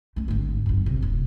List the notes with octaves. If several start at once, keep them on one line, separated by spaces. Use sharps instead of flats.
A3 C#4
G#1 D2
G1 F#2
C3
D#1